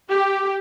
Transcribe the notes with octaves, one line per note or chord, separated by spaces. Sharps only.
G4